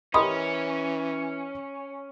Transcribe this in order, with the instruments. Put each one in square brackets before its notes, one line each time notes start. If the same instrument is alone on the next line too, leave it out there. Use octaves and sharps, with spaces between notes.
[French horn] E3 [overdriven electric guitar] C#4 [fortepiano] G4 A#4 D#5 [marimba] B5 C6 D#6